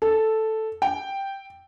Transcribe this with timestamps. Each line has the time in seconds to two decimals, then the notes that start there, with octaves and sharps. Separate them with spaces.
0.02 A4
0.82 G5